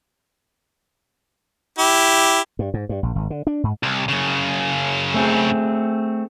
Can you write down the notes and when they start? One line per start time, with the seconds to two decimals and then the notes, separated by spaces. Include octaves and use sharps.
1.79 E4 G4
2.59 G2
2.74 G#2
2.89 G2
3.03 A#1
3.16 G#1
3.30 D3
3.47 D4
3.63 G#2
3.83 C2
4.09 F#2 C#3
5.14 A3 C4 G#4